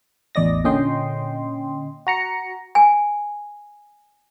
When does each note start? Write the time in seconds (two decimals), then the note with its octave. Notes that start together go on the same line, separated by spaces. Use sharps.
0.35 A1 E2 D5 D#5 A#6
0.64 A#2 D3 C#4 D#5 G5 C6
2.07 F#4 A#5 C#7
2.75 G#5